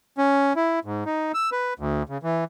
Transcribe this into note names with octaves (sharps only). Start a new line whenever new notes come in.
C#4
E4
G#2
D#4
E6
B4
D2
C#3
E3